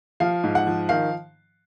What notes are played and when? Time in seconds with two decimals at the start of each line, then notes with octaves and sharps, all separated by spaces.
0.20 F3 F5
0.44 G#2
0.55 F#5
0.67 F3
0.89 D#3 F5